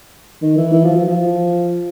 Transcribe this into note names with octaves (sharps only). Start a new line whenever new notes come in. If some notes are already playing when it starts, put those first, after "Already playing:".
D#3
E3
E3
F3
F3
F3